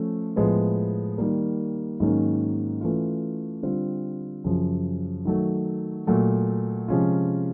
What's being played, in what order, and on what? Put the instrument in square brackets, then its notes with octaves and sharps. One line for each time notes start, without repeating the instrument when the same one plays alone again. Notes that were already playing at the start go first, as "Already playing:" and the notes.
Already playing: [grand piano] F3 A3 C#4
A2 F3 G#3 B3
D#3 G3 A#3
G#2 D#3 F#3 A#3 C#4
E3 A3 C#4 F4
D3 G3 C4 F4
F#2 C#3 F3
D#3 F#3 A3
A#2 F#3 A3
C3 F3 G#3 C#4 F4